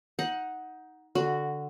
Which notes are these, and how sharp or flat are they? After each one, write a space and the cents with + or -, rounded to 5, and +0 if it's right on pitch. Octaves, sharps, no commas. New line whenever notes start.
D#4 +15 F#5 +0
D3 +0 F#4 +0